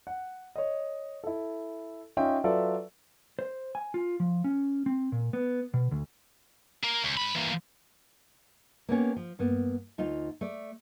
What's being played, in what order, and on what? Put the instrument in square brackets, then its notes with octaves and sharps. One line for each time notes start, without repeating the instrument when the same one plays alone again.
[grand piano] F#5
C#5 D#5
E4 A4
C#4 D#4 F4 D#5 E5 G5
F#3 F4 A4 B4 D5 E5
[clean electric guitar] C5
G#5
F4
F3
C#4
C4
A#2
B3
B2
D2
[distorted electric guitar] A#3
C#2
G#2 B5
E3 A#3
[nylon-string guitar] A#3 B3 C#4 G4
F3
G2 A#3 B3
D2 D#4 F4
A3 D5